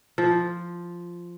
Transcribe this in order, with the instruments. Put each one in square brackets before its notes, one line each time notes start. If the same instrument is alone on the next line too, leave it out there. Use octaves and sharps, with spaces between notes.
[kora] F3